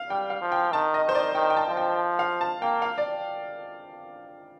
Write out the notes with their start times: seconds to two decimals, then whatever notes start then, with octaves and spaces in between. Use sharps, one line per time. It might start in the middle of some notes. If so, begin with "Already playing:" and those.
Already playing: F5
0.10 G3 G5
0.30 F5
0.42 F3
0.52 G5
0.72 D#3 A5
0.94 D#5
1.05 D#3 C5
1.15 D5
1.35 D#3 G5
1.50 G5
1.57 A5
1.67 F3
1.77 G5
2.19 F5
2.41 A5
2.61 A#3 G5
2.82 F5
2.98 D5